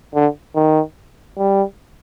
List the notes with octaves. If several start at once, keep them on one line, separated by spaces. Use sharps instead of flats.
D3
D#3
G3